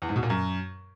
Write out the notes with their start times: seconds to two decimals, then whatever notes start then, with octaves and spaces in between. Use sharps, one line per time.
0.02 E2
0.09 G#2
0.16 B2
0.23 A#2
0.30 F#2